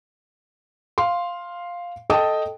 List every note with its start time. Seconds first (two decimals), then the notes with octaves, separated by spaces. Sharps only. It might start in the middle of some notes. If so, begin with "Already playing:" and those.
0.98 F5 C6
2.10 A4 D#5 G5 A5 D#6